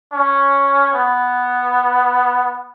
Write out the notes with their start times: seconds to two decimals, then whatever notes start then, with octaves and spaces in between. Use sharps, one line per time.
0.12 C#4
0.93 B3